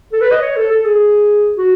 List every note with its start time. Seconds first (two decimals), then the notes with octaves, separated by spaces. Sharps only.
0.13 A4
0.21 B4
0.31 D#5
0.42 C#5
0.56 A4
0.71 A4
0.85 G#4
1.58 F#4